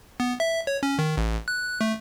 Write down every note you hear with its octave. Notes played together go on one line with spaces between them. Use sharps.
B3
E5
C#5
C#4
D#3
A1
F#6
A3